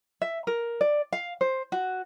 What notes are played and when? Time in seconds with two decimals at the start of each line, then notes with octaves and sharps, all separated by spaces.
0.22 E5
0.47 A#4
0.81 D5
1.13 F5
1.41 C5
1.72 F#4